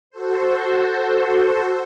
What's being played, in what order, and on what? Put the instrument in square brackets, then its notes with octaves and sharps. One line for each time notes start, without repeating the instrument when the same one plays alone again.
[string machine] F#4 A4 C5